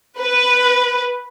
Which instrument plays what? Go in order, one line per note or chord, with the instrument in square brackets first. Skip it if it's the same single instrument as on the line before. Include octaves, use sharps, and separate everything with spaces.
[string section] B4